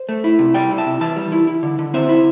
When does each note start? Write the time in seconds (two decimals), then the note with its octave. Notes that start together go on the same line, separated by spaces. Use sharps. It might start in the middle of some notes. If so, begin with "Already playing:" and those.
Already playing: C5
0.09 A3
0.24 E4
0.39 C3
0.54 G3 D5 G5
0.71 E4
0.78 E5 A5
0.86 C3
1.01 E3 E5 A5
1.16 G3
1.32 E4
1.47 E4
1.63 D3
1.79 D3
1.94 C4 C5 E5
2.09 E4